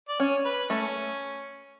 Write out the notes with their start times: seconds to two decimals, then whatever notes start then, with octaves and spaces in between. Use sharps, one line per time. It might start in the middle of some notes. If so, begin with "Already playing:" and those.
0.08 D5
0.20 C#4 C#5
0.45 B4
0.70 A3 C#4